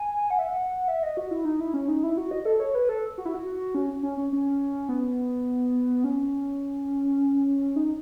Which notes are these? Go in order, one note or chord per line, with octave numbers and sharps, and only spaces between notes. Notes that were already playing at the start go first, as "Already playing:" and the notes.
Already playing: G#5
F#5
E5
F#5
E5
D#5
F#4
E4
D#4
E4
C#4
D#4
E4
F#4
D#5
A4
C#5
B4
A4
F#4
E4
F#4
C#4
C#4
C#4
C#4
B3
C#4
D#4